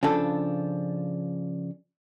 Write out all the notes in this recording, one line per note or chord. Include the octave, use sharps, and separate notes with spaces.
C#3 F3 D4 A4